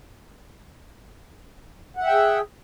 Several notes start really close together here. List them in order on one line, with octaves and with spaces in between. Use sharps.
F#5 E5 G5 G#4